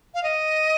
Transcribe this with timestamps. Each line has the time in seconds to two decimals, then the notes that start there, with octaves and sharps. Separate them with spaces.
0.14 F5
0.24 D#5